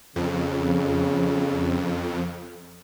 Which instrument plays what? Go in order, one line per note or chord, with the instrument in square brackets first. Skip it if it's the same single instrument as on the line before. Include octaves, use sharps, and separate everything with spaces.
[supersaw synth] F2 [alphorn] C#3